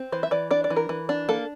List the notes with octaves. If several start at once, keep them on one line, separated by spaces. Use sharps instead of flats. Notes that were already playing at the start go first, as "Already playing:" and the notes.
Already playing: C4
E3 C5
E5
E3 D5
D4 D5
D5
E3
A#4
E3
D4
A#3 A4